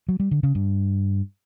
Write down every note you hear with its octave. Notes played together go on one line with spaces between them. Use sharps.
F#3
G3
D3
C#3
G2